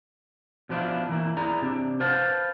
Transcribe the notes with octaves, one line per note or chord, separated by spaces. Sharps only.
B2 F3 B3 D4 E4 F4
E3 A#3 E4
E4 G#4 D5 A#5
C3 D4
B4 C5 F5 F#5 A5